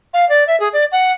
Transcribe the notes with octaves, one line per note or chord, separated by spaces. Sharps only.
F5
D5
E5
G#4
D5
F#5